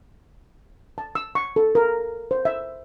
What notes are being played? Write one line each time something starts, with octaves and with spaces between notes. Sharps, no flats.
A5
E6
C#6
A4
A#4
C5
E5